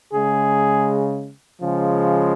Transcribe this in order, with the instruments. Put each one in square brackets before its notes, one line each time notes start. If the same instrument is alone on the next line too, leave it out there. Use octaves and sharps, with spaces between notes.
[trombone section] C#3 G#3 G#4
C#3 F3 G#3